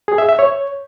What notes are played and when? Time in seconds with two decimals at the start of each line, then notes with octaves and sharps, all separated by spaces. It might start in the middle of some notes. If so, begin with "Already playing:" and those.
0.08 G#4
0.18 E5
0.29 E5
0.39 C#5